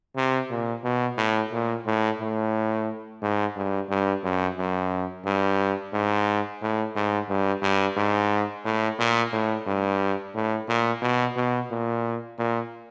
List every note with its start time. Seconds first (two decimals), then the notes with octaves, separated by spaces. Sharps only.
0.17 C3
0.50 A#2
0.84 B2
1.18 A2
1.53 A#2
1.86 A2
2.20 A2
3.22 G#2
3.56 G2
3.90 G2
4.24 F#2
4.58 F#2
5.25 G2
5.93 G#2
6.61 A2
6.96 G#2
7.29 G2
7.62 G2
7.97 G#2
8.65 A2
8.99 A#2
9.33 A2
9.66 G2
10.34 A2
10.68 A#2
11.02 B2
11.36 B2
11.71 A#2
12.38 A#2